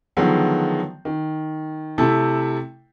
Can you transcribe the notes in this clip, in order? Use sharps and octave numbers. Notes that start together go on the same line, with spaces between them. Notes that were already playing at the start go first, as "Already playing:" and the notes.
D3 D#3 F3 F#3 G#3 B3
D#3
C3 A3 E4 A4